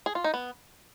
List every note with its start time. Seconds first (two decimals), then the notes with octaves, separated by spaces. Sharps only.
0.06 G#4
0.15 F4
0.24 D#4
0.34 B3